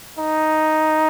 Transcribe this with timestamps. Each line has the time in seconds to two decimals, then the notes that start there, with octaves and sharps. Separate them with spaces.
0.19 D#4